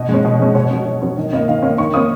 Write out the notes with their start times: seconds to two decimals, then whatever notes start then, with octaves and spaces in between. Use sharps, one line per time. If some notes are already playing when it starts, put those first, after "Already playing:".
Already playing: B2 D#5
0.09 G#3 C#4
0.25 B2
0.39 G#3 C#4
0.55 B2 C#5
0.70 F#3 C#4
0.85 B2
1.02 F#3 C#4
1.17 D#3 D#5
1.33 A#3 C#4 D#5
1.48 D#3 F5
1.62 A#3 C#4 D#5
1.78 D#3 C#6
1.94 A#3 C#4 D#6